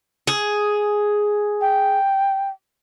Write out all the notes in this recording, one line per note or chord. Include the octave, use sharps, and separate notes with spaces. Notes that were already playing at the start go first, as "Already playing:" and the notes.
G#4
G5